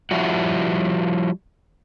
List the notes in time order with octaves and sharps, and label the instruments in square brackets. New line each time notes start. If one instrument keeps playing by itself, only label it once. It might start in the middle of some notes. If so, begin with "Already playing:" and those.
[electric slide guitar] F3 G3 E4 F#4